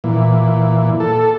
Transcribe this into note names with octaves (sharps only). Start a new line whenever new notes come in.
A#2 E3
A4